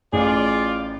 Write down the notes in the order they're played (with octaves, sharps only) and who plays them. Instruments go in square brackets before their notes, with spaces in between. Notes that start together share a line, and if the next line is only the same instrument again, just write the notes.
[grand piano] A1 [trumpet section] F4 D5 [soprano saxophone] G#4